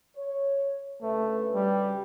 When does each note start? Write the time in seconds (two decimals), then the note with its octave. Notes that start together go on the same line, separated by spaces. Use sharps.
0.16 C#5
1.02 D2 C#3 A3 B4
1.54 G3